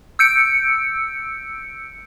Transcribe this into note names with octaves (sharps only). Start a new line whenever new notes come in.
E6 G6 C#7 D7